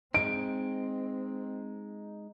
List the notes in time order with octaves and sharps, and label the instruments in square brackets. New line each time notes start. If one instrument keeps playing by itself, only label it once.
[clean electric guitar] G#3 D#4 [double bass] C4 [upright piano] D7